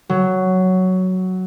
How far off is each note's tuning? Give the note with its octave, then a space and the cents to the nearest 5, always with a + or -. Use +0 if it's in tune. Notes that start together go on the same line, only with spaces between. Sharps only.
F#3 +5